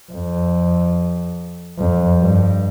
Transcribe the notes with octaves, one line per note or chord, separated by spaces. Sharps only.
F2
F2
G2